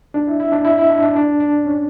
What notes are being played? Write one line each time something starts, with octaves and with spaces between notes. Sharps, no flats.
D4
E4
E4
D4
E4
E4
D4
D4
D4
D4
C#4